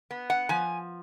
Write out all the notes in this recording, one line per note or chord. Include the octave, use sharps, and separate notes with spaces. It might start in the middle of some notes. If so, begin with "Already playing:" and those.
B3
F#5
F3 G#5